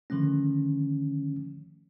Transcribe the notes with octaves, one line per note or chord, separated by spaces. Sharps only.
D3 D#3 F3 A3 C#4